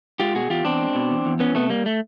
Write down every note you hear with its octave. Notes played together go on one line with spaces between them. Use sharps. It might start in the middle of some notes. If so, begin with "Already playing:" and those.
G#3 F4 G4
B2 F#4 G#4
E2 F4 G4
E2 C4 D4
G#3
B2
E2
E2
E3 B3 C#4
C3 A3 B3
G3 A#3
A3